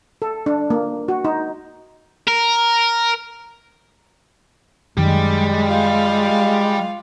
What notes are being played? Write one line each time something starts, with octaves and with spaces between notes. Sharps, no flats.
A4
D4
A#3
F#4
D#4
A#4
F#2 D#3 G3 G#3 G4
F4 F5